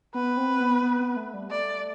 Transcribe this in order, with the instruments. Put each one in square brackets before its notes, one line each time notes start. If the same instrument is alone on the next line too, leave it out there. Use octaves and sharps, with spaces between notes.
[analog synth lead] B3 [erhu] B4
[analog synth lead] C4
B3
B3
B3
A3
G3
[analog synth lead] A3 [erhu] D5